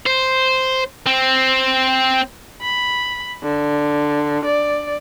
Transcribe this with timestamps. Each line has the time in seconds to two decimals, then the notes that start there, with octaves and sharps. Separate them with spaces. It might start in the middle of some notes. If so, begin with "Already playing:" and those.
0.06 C5
1.07 C4
2.62 B5
3.43 D3
4.45 D5